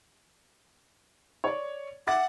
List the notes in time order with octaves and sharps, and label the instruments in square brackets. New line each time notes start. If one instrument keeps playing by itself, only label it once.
[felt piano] C#5 D5
[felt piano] E5 D6 A6 [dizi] F#5